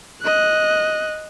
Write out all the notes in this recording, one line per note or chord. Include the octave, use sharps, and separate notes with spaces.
D#5 F#6